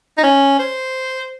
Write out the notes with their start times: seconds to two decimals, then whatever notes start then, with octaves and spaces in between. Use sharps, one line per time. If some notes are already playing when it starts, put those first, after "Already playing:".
0.18 D#4
0.23 C#4
0.59 C5